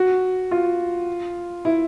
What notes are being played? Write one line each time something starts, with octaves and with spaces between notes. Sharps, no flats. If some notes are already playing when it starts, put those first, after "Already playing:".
Already playing: F#4
F4
E4